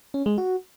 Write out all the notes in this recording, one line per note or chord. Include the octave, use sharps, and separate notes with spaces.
C#4
G#3
F#4